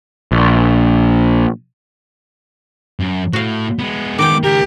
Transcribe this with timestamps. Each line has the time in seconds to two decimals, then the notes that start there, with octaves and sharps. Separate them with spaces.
0.32 A#1
3.00 F#2
3.33 A2 F#4 F5
3.79 G#3 B3
4.18 D#3 G5 D6
4.44 C#2 G4 A#4